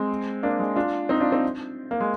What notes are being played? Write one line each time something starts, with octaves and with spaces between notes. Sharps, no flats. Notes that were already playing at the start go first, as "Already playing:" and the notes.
Already playing: G#3 C4
A#3 D4
G#3
D4 F4
C4 D#4
D4 F4
C4 D#4
A#3
G#3